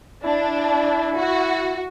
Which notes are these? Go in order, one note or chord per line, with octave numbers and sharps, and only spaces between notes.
D4 E4
F#4